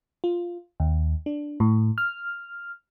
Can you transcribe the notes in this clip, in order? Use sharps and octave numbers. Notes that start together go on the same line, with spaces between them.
F4
D#2
D4
A2
F6